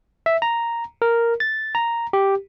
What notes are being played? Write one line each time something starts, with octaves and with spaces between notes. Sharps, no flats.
E5
A#5
A#4
A6
A#5
G4